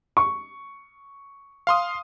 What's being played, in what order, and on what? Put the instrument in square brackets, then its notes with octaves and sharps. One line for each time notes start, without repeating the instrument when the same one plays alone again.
[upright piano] C#6
[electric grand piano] F5 C6 D#6